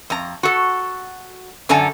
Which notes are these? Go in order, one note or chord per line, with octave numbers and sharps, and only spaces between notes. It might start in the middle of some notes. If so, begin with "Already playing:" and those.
F2 A#5
F#4 A4
F#2 D3 A4 G#5 A#5